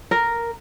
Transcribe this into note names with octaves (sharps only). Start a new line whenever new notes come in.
A#4